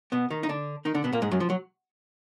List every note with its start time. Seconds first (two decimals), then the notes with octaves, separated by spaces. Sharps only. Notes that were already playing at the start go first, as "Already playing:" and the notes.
0.12 B2 B3
0.30 D#3 D#4
0.43 D#4
0.49 D3 D4
0.85 D#3 D#4
0.94 D3 D4
1.04 B2 B3
1.13 A#2 A#3
1.22 G#2 G#3
1.31 F#2 F#3
1.40 F3
1.50 F#3